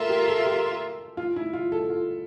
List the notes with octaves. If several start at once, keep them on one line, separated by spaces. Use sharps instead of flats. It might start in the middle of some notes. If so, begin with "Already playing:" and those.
Already playing: A#3 F4 A4 A#4 E5
G4
A4
G4
F4
E4
F4
A4
F4